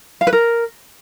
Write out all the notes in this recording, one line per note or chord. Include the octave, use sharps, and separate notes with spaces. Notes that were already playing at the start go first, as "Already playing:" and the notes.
F5
B4
A#4